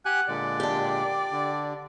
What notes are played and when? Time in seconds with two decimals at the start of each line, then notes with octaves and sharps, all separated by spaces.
0.05 G4 F#5 G#5 F#6
0.28 A#2 D3 G#3 D5
0.60 D4 G4
1.32 D3